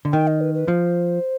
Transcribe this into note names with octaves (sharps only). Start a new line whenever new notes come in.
D3
D#3 G5
D#5
B4
B4
F3 C5